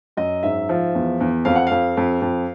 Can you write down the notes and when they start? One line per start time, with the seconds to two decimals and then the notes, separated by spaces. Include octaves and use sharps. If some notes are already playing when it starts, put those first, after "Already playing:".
0.17 F#2 D#5
0.43 G#2 E5
0.69 F3
0.95 E2
1.20 E2
1.45 F2 F5
1.55 F#5
1.67 F2 F5
1.97 F2
2.22 F2